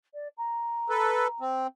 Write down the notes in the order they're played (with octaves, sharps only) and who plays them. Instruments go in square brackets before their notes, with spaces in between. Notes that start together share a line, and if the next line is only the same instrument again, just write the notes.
[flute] D5
A#5
[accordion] A4 B4
C4